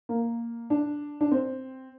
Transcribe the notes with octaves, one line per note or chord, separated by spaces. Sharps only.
A#3
D4
D4
C4